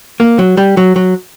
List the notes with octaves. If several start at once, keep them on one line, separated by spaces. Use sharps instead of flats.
A#3
F#3
G3
F#3
F#3